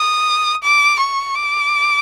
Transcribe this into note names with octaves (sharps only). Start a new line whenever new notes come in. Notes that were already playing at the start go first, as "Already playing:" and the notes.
Already playing: D#6
D6
C#6
D6